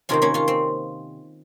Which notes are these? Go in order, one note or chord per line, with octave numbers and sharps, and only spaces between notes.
C3 D#3 A#3 C#4 F4
A#3 C#4
C#4 F4
C4